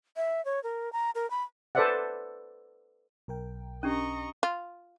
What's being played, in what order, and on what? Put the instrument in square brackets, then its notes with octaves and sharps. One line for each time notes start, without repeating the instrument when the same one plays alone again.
[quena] E5
C#5
A#4
A#5
A#4
B5
[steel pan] A4 B4 C5 D5 E5 F#5
[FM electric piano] B1 A#4 G5
[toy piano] C#4 D4 G4 [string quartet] D#5 A#5 C#6
[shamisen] F4